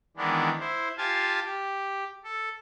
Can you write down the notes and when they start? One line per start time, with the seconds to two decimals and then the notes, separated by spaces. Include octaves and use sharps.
0.17 D#3 E3 G#3 B3 D4
0.59 E4 C5
0.97 F4 G4 F5 G#5 A5
1.44 G4
2.24 A4